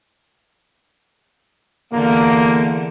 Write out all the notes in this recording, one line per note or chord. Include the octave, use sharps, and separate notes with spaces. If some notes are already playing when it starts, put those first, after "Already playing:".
E2 D3 A#3